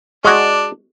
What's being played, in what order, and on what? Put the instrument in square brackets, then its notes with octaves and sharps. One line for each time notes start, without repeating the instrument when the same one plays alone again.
[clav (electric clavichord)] G#3 F#4 [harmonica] D4